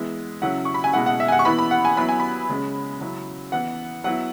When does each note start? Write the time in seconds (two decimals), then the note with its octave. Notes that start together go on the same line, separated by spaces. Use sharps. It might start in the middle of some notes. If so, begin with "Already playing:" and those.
Already playing: E3 G#3 B3 E4
0.42 C#3 F#3 C#4 E4 F#5
0.65 C#6
0.74 B5
0.84 G#5
0.93 B2 G#3 E4 F#5
1.06 F#5
1.20 E5
1.28 G#5
1.32 F#5
1.39 C#6
1.45 E3 B3 E4 B5
1.59 B5
1.71 F#5
1.85 G#5
1.97 F#3 B3 E4 B5
2.09 G#5
2.20 B5
2.49 C#3 G#3 C#4
3.00 C#3 F#3 C#4 E4
3.52 E3 B3 E4 F#5
4.04 F#3 B3 E4 F#5